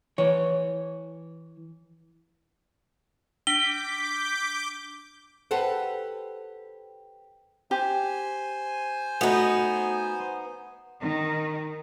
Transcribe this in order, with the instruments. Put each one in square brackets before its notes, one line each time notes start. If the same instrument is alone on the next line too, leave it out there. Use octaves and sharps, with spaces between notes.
[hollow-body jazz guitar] E3 C#5
[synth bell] D4 D7 [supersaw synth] D6 G6 [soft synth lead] B6 [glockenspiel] G7
[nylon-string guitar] G4 A4 B4 C5 F#5
[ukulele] G4 [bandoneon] C5 G#5
[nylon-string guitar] A3 F#4 [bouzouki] B3 D#4
[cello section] D#3